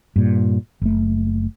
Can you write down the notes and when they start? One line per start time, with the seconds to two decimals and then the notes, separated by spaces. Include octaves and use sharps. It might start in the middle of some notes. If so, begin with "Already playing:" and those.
0.16 G2 A#2
0.81 F#1 A3